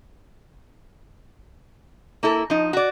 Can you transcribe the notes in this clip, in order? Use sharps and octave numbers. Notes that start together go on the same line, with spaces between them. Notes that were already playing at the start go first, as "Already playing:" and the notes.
A#3 E4 A4
F3 D#4
F#4 D5